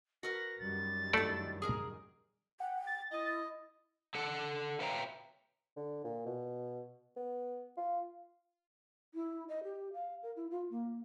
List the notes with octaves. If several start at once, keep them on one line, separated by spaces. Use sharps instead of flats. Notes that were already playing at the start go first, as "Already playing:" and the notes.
F#4 A#4 B4 A#6
F#2 D#3 G3 A6
A3 D4 E4 A4 D5
G#4 A#4 A#5
F#5 G5
A6
E4 D#5
D3 A4 F#5
B4 C#5 E5 F5 G5 A#5
D3
A#2
B2
B3
F4
E4
D#5
G4
F5
A#4
E4
F4
A#3